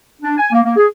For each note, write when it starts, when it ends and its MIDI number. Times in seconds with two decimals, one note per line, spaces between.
0.22 0.35 62
0.38 0.50 80
0.52 0.60 58
0.64 0.75 58
0.76 0.86 68